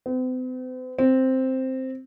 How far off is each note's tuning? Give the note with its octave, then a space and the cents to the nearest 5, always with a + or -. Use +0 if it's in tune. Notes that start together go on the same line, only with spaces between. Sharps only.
C4 -45
C4 +0